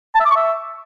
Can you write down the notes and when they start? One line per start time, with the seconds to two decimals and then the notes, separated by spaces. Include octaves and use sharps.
0.15 A5
0.20 E5
0.25 D6
0.31 C#6
0.36 E5